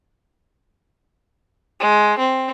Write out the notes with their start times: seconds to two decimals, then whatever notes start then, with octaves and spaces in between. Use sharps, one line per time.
1.80 G#3
2.18 C4